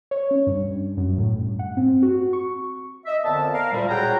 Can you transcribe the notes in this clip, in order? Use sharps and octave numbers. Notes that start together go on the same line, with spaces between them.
C#5
C#4
G2
F#2
A2
G2
F#5
C4
F#4
C#6
D#5 E5
F2 A#2 D3 B3 D5 A5
A#4 F5
D2 A#2 G3
F#4 G#4 C#5 F#5 G5 A#5